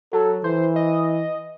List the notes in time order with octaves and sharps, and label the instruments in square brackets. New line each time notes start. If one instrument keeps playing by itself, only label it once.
[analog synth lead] F#3 [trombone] A4
[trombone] E3 [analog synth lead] C5
[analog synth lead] D#5